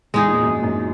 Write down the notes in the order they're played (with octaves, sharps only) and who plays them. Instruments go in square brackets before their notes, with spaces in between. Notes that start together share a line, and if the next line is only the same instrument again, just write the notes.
[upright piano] E2 [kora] G#3 D#4 G#4
[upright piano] A#2
G#2
F#2
G#2
F#2